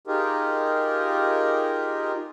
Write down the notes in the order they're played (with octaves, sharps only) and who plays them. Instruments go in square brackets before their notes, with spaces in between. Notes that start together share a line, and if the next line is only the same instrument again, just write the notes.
[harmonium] D#4 F4 G4 G#4 A#4